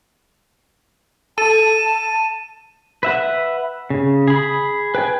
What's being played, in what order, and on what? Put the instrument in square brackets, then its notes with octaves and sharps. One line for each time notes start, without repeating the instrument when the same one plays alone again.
[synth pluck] A4 [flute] A5 [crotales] D#7
[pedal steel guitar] B4 E5 F#5
C#3
G#4 B5
B4 G5 G#5